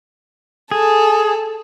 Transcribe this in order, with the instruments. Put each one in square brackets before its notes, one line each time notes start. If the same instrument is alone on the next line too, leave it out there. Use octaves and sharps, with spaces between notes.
[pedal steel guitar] G#4 [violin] A4